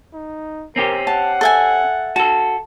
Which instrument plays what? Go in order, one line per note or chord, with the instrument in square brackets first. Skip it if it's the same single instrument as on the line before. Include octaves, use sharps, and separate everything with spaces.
[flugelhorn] D#4
[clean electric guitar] C4 C#4 G4 [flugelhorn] A#4
[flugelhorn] F#5 [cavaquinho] A5
[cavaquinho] A4 E5 G#5
[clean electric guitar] F#4 A4 [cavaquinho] A5